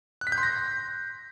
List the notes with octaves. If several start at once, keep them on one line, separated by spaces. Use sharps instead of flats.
F#6
B6
G6
C6
A#6